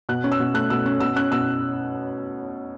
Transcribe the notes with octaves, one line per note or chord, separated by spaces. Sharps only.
B2 F#6
C#4
E6
B2
A3 F#6
B2 E6
C#4
B2 E6
C#4 F#6
B2 E6